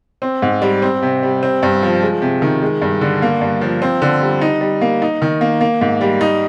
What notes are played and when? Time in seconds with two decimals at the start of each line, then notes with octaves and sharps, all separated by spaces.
0.22 C4
0.42 G#2
0.62 G3
0.82 C4
1.02 C3
1.23 G3
1.43 C4
1.63 G2
1.83 F3
2.02 G#3
2.22 C3
2.42 D#3
2.62 G#3
2.82 G2
3.01 D3
3.22 A#3
3.41 G2
3.61 F3
3.82 C4
4.02 D3
4.21 G3
4.41 D#4
4.61 G3
4.81 A#3
5.02 D#4
5.22 D#3
5.41 A#3
5.61 A#3
5.81 G#2
6.01 G3
6.21 D#4